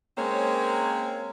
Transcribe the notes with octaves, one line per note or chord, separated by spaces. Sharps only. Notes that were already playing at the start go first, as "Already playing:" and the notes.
G#3 A#3 C4 C#4 C5 C#5